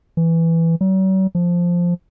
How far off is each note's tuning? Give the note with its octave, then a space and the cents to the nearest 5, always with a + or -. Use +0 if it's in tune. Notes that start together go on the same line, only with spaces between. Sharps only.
E3 +5
F#3 +45
F3 +0